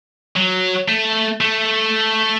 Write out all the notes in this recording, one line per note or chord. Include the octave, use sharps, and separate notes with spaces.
F#3
A3
A3